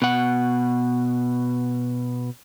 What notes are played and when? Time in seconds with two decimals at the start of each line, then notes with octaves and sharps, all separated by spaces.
0.02 B2 F#5